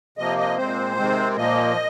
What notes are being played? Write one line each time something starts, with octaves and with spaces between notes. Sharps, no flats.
C3 F3 A#3 D#5
D#5
A#2 G#3 C4 C5
C3 D#3 G#3 C4
A#2 F3 A#3 D#5